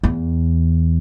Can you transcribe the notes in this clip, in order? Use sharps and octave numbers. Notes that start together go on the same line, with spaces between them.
E2